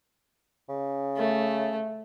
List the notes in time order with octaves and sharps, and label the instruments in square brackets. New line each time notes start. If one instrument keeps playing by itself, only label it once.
[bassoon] C#3
[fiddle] A3